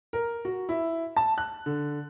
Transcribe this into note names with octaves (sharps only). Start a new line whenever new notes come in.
A#4
F#4
E4
A5
F#6
D3